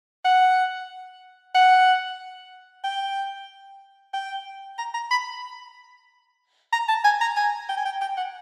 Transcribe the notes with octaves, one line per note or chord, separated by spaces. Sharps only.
F#5
F#5
G5
G5
A#5
A#5
B5
A#5
A5
G#5
A#5
G#5
G5
G#5
G5
G5
F#5